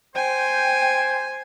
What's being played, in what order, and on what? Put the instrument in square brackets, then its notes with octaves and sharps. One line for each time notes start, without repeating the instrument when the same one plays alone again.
[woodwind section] C5 [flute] G5 [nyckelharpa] G#5